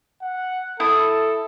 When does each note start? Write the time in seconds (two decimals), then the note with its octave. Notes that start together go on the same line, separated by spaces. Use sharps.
0.22 F#5
0.80 E4 A4 D#6